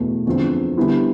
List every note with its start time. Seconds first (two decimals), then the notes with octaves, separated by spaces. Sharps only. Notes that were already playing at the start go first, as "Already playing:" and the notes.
Already playing: E2 B2 A3
0.26 E2 D3 F3 C4
0.77 D3 G3 B3 E4